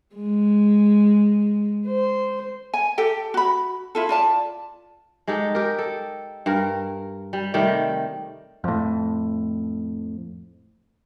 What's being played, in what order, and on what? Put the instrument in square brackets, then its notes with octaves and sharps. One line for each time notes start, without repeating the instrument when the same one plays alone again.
[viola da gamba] G#3
C5
[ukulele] G#5
G4 A4 G5
F#4 B5
E4 F4 A4
F4 D5 A5
[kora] G#3 D#4 G4 A4
G4 A#4
A4
G2 A#4
G3
C3 D#3 G3 A3
[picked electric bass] F2 A2